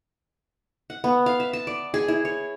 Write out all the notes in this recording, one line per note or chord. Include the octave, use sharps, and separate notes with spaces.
F#5
B3
F5
E5
A5
D5
G#4
E4
C#5